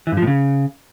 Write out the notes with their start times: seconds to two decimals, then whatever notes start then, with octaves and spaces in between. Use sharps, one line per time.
0.07 E3
0.12 G2
0.17 F3
0.22 A2
0.27 C#3